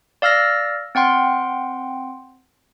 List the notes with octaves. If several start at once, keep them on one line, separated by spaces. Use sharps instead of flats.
D5 F5 E6 F6 A#6
C4 F#5 G5 C6